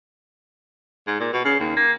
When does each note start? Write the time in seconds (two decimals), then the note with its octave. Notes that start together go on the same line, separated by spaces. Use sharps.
1.07 G#2
1.20 A#2
1.33 B2
1.45 C#3
1.60 D#2
1.77 A#3